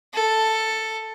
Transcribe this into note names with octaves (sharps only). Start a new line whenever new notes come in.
A4